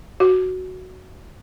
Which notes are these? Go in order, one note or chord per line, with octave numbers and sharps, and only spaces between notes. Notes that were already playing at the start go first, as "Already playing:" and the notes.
F#4